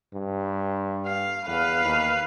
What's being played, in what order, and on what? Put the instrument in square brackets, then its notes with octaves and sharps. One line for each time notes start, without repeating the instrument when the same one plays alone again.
[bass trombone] G2
[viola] F5
[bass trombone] E2 [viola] B4 F5
[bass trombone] D#2